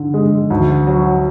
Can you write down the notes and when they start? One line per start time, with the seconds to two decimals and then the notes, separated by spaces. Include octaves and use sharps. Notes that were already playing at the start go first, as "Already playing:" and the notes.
Already playing: D3
0.14 G#3
0.50 D2
0.87 F#3